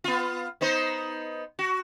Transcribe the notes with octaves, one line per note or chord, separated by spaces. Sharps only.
B3 F4
B3 D#4 C5
F#4